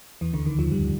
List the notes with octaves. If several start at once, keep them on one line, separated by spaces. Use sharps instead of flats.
E2 E3
D2 D3
D#2 D#3
F2 F3
G2 G3